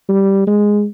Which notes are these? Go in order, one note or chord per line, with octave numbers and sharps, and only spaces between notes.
G3
G#3